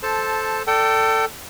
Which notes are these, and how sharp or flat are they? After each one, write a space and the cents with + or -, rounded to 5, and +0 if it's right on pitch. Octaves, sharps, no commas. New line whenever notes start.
A4 -10 C5 +0 A5 +0
A4 +20 D5 +0 G5 -25